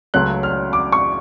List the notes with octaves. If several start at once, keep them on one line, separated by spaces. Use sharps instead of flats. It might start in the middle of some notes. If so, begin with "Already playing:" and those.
C#2 C#3 F#3 A3 C#4 F#6
F6
D6
C#6